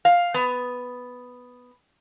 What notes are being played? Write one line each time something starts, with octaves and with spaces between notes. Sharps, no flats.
F5
B3